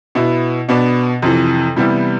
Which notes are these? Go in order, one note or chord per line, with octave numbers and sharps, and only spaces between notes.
B2 B3 E4
B2 B3 D4
F2 C3 E3
C3 E3 G3 B3 E4